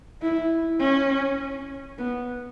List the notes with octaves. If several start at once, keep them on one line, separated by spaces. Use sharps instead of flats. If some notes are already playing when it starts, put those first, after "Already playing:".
E4
C#4
B3